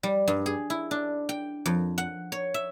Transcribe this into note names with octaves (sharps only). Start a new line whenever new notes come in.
G3
G2
G#4
E4
D4
G5
F2
F#5
C#5
E5